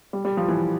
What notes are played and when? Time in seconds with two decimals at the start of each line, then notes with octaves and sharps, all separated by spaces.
0.13 G3
0.25 G3
0.37 F3
0.48 E3